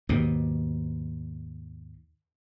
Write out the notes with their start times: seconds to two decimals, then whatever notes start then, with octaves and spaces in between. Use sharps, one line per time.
0.09 D#2 G#2 B2